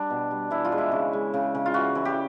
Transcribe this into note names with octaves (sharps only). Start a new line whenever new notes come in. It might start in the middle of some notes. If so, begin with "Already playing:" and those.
Already playing: G3 D4
B2
G3
E3 E4
F4
G#3
E4
C#3
G#3
C#3
C#3
F4
E3 F#4
E3
G4